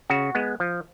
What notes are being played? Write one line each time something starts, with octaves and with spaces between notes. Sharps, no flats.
C#3 F#4
G#3 B3
F3